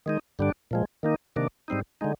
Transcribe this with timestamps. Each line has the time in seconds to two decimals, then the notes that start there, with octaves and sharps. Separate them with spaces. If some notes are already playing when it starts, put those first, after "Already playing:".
0.06 D#3 G#3 D#4
0.39 G2 D3 G3 D4
0.71 A#2 F3 G#3
1.03 D#3 A#3 D#4
1.36 C3 D#3 A#3 D4
1.68 G#2 G3 C4 D#4
2.01 D3 G#3 D#4